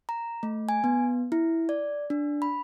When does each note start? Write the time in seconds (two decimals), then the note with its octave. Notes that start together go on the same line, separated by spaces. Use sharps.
0.09 A#5
0.43 A3
0.69 G#5
0.84 B3
1.32 E4
1.69 D5
2.10 D4
2.42 B5